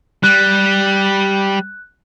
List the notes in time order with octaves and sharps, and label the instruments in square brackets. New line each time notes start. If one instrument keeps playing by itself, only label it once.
[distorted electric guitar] G3 [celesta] F#6